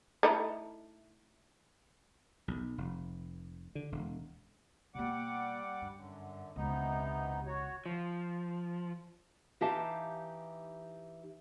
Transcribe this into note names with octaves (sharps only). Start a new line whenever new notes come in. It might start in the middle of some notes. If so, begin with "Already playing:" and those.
A3 D#4 E4
B1
F1
D3
E1
B2 G3 A#3 F#5 D6
G2
F#2 D3
E1 C#2 C3 B3 D#4
F#4 C#5
F3
E3 D#4 G4 E5 F5 A5